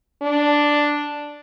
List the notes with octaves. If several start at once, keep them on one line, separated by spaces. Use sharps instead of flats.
D4